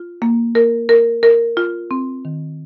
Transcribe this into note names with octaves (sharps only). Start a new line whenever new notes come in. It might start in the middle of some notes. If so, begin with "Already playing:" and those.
Already playing: F4
A#3
A#4
A#4
A#4
F4
C4
D#3